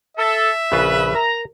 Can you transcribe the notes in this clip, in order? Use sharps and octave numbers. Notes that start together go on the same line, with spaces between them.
A4 E5
A#1 C#3 F4 B4
A#4 A#5